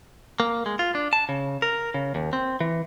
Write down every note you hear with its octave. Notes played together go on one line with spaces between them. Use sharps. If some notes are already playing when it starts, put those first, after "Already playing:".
A#3
G#3
F4
D4
A5
C#3
A#4
C#3
D#2
C4
E3